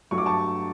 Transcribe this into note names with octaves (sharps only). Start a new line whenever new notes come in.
G2 F#3 A3 C#6
D6
A5 C#6